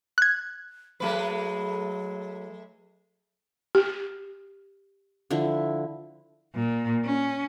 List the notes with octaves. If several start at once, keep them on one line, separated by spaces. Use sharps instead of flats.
F#6 G#6
F#3 G#3 A3 B4
G4
D3 F3 E4
A#2
C#4